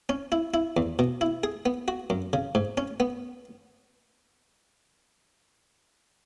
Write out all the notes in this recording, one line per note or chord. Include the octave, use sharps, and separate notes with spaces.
C#4
E4
E4
E2
B2
E4
G#4
B3
F#4
F#2
C#3
G#2
C#4
B3